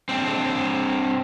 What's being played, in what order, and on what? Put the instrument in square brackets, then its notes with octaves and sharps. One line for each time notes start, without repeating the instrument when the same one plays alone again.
[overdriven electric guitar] C4 D4